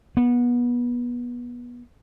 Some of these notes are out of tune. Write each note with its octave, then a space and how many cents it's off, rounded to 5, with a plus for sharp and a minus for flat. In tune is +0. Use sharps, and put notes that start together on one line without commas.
B3 -25